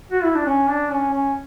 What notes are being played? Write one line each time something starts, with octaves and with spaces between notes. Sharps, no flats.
F#4
E4
D4
C#4
D4
C#4
C#4